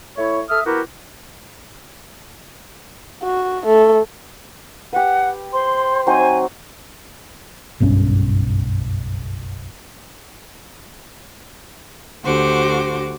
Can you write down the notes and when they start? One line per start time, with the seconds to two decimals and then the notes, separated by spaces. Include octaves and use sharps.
0.17 A3 E4 C#5
0.49 A4 E5 D#6 F6
0.66 B3 E4 F#4 G4 A#4
3.24 F#4
3.66 A3
4.93 G4 B4 F#5
5.52 C5 C6
6.07 F#3 C4 D#4 G#5
7.80 F#1 B1 G2 C#4
12.23 D2 D3 F#4 G4 C5 D6